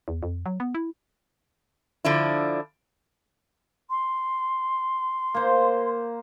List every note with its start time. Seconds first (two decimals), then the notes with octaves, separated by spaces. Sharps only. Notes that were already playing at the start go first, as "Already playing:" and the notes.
0.08 E2
0.23 F2
0.46 F#3
0.60 B3
0.75 E4
2.05 D3 F3 D4 E4
3.90 C6
5.34 A#3 C5